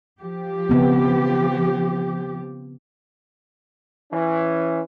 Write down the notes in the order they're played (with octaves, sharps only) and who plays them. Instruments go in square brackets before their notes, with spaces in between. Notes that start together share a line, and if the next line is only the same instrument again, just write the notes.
[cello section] F3 G4
[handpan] C#3 B3 C4
[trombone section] E3 C#4